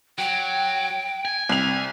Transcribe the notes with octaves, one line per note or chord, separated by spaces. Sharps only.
F#3 G5
G#5
C2 F7